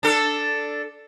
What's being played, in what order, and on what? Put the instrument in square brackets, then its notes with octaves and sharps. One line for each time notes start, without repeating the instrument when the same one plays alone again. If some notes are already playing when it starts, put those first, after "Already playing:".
[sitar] D4 A4